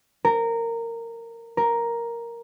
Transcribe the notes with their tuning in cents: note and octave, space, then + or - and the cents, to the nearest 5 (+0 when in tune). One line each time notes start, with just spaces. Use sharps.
A#4 -15
A#4 +5